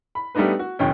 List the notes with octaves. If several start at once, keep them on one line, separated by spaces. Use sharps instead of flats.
B5
G3 A3 B3 D4 D#4 B4
F#4
F#1 D#2 B2 C#4 G5